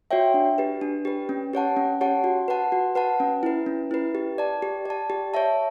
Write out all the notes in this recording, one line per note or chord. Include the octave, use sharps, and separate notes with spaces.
F#4 C#5 E5 G5
D4
G4 B4
D4
G4 B4
C#4
G4 C#5 F#5 A5
C#4
G4 C#5 F#5 A5
F#4
B4 F#5 A5
F#4
B4 F#5 A5
C#4
E4 B4
C#4
E4 B4
G4
D5 A5
G4
D5 A5
G4
C#5 E5 A5